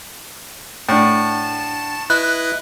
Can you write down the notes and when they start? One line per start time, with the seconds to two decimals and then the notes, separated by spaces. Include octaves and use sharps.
0.89 A2 D4 F#5 G5 A5
2.10 E4 B4 D#5 F#6